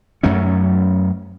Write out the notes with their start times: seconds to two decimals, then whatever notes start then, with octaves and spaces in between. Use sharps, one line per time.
0.23 F#2 F#3 A3 C#4